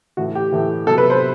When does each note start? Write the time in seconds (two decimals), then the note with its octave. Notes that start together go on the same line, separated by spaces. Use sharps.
0.17 A2 E3 A3 F#4
0.35 G4
0.52 A2 E3 A3
0.86 C3 F#3 B3 A4
0.98 B4
1.10 C5